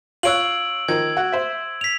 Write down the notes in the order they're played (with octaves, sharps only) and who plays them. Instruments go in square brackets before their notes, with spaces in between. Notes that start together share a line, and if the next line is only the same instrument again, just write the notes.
[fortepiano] F4 C#5 F#6 [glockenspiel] E6 D7 F#7
[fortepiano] D#3 F3 [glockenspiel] G#6
[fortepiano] F#4
C5 E5
[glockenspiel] B6 F7